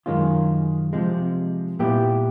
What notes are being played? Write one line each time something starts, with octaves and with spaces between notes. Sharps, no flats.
F#2 D#3 G#3 C#4 F4
C3 F3 G#3
A#2 G3 B3 E4 G4